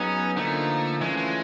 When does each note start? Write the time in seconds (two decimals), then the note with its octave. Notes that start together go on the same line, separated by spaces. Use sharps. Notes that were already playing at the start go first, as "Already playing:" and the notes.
Already playing: F#3 B3 C#4 D#4 G#4
0.36 D3 F3 A3 A#3 D#4
1.01 E3 G#3 A3 C#4 F4
1.17 G#3